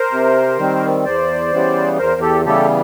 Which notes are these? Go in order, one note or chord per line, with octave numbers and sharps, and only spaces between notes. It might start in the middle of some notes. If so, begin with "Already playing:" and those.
Already playing: A#4 C5
C3
D#3 G3 C4
E2 C5 D5
C#3 E3 G3 B3
E2 A#4 C5
G4 A4
C#3 E3 G3 B3 G4 A4